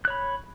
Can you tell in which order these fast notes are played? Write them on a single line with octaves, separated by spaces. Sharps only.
F#6 C#5 B5